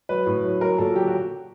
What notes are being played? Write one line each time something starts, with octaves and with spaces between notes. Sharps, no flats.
F#3 B4
A2
F#3
F#3 A#4
A#2 A4
F#3 G4
F#4